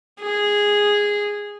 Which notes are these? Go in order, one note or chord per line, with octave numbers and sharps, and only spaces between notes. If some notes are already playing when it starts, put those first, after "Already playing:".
G#4